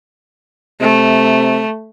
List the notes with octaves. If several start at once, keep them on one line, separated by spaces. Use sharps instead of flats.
C3 A3